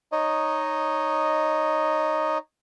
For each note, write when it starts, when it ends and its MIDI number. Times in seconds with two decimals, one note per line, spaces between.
0.12 2.38 63
0.12 2.38 73
0.12 2.38 75